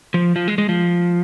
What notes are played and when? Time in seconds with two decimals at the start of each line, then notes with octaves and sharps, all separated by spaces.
0.14 F3
0.36 F3
0.48 G#3
0.58 G#3
0.69 F3